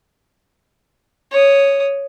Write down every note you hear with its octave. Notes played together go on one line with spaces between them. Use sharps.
C#5 D#6